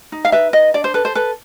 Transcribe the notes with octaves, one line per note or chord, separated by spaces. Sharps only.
D#4
F5
B4 E5
D#4 D#5
D4 D5
C5
A4 B4
C5
A4 B4